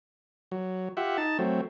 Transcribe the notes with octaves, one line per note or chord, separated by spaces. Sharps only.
F#3
F4 G4 E5 F#5
D#4 A5
F#3 A3 C4